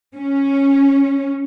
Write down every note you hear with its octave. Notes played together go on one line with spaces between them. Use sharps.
C#4